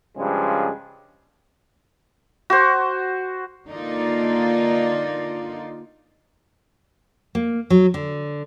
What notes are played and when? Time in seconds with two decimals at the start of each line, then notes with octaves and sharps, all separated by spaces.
0.17 G2 C#3 F3 G#3
2.50 F#4 C5
3.68 D3 A#3 D#4 F4 D5
7.35 A#3
7.70 F#3
7.94 D3